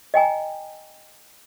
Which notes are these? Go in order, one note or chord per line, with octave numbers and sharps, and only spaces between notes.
D#5 G5 G#5 A#5